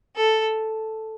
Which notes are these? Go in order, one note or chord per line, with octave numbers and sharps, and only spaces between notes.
A4